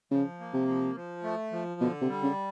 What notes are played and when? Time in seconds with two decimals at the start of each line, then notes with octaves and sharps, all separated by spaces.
0.11 C#3 F3
0.40 A#3
0.53 C3
0.68 F3
0.95 F3
1.23 A3
1.52 F3
1.81 B2 D3
2.01 C3
2.09 G3
2.23 C#3